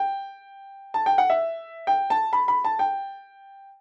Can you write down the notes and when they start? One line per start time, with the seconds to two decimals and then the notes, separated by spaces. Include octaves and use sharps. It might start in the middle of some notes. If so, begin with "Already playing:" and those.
Already playing: G5
0.94 A5
1.06 G5
1.18 F#5
1.30 E5
1.87 G5
2.10 A5
2.33 B5
2.48 B5
2.65 A5
2.79 G5